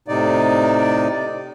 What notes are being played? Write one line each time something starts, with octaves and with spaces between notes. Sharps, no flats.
A2 C3 D#4 D5